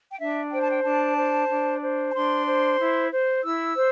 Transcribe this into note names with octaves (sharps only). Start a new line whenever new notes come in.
G5
D4 E5
C5 G5
A5
G5
D4 A5
C5
D4
C5
A5
D4 C6
C5
E4
C5
E4 E6
C5